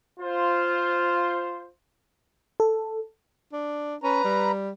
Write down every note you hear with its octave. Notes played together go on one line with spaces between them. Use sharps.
F4 C5
A4
D4
C#4 B4 A#5
G3